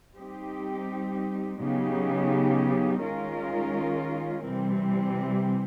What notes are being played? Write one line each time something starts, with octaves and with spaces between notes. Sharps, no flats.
G3 C4 D#4 G4
C#3 F#3 B3 D#4 G4
D#3 G#3 C#4 F4 A#4
C3 E3 G3 C4